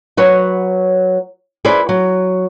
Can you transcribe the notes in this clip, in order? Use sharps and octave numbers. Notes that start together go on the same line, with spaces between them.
F#3 B4 C#5 F#5
E4 G#4 B4 C5 D5
F#3